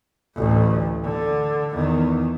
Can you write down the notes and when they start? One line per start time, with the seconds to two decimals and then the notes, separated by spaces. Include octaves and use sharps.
0.36 A1 D2
1.04 D3
1.73 E2 D#3